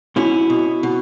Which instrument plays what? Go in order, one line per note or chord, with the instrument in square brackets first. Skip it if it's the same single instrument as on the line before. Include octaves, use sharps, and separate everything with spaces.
[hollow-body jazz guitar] B2 C#4 E4
B2
B2